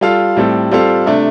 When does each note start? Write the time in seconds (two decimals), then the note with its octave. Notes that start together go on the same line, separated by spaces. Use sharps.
0.01 G3 F4 A4 F5
0.36 A2 G3 C4 A4
0.71 G3 C4 F4 A4 F5
1.06 C3 A3 D4